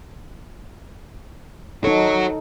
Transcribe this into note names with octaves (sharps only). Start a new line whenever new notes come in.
D#4 F#4 A4 C#5